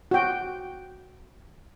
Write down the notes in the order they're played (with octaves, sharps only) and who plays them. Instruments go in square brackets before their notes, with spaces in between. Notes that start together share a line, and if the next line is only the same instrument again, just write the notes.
[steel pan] F#4 G5